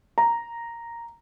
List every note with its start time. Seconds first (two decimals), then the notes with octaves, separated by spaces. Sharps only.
0.18 A#5